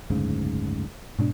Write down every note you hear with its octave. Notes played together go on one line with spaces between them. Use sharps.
F#1 D2 G#2 C#3
G#2 B2 C#4 D4